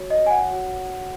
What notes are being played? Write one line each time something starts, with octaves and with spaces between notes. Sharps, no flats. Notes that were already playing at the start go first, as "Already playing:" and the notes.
Already playing: F#4 C#5
D#5
G#5
F#5
F#4 C#5